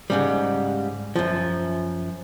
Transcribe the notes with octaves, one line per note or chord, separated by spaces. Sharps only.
G#2 C#3 G3
F#2 F3